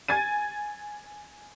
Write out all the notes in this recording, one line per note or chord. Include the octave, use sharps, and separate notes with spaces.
G#5 G#6 A6 D#7